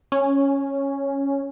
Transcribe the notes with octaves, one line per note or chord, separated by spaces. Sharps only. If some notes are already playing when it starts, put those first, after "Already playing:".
C#4